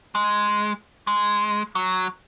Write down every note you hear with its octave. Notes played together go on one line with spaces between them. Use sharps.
G#3
G#3
F#3